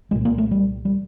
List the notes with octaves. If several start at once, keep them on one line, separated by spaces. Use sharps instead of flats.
C2 A#2 G#3
A#3
A3
G3
G3